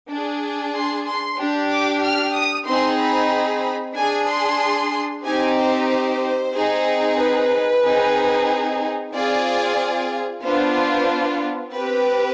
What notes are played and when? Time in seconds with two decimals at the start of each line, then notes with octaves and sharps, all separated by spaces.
0.10 D4 G#4
0.75 C6
1.07 C6
1.39 D4 G4
1.71 D6
2.04 F6
2.36 D#6
2.68 C4 D#4 G#4 C6
3.00 B5
3.97 D4 G#4 G#5
4.30 C6
5.26 C4 D#4 G4 G#5
5.59 C5
5.91 C5
6.55 C4 D#4 G#4
7.20 B4
7.84 C4 D#4 G#4
9.13 C4 F4 G#4 D5
10.42 B3 D4 F4 C5
11.71 C4 G4 B4